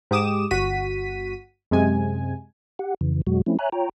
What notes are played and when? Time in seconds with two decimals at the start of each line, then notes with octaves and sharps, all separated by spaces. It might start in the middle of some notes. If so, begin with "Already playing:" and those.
0.11 G#2 G4 D6 D#6 E7
0.51 G1 F#4 B6 D#7
1.71 F#2 C3 G#3 G#5
2.79 G4 F#5
3.01 F2 C#3 E3
3.27 F2 B2 F#3 G#3 F#4
3.46 F3 A3 C4 C#4 E4
3.59 C#5 E5 G#5 A#5 F#6
3.72 F4 C#5 G5 A#5